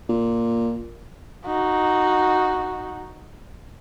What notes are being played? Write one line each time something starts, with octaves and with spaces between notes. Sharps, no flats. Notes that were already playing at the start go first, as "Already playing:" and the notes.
A#2
D#4 F#4